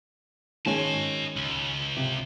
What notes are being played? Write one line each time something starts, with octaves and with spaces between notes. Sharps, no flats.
D#3 G#3 C#4 D#5 A5
C#2
C3